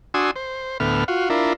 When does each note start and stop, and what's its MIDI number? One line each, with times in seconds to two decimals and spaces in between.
0.14 0.31 62
0.14 0.31 66
0.14 0.31 80
0.14 0.31 84
0.14 0.31 87
0.14 0.31 88
0.36 0.78 72
0.80 1.04 38
0.80 1.04 45
0.80 1.04 59
0.80 1.04 89
1.08 1.29 65
1.08 1.29 66
1.30 1.53 62
1.30 1.53 64
1.30 1.53 65
1.30 1.53 70